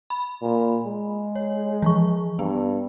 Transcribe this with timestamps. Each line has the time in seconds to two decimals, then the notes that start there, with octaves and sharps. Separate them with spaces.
0.10 B5
0.42 A#2
0.86 G#3
1.36 C#5
1.82 E3 F3 C#6
2.39 G2 B3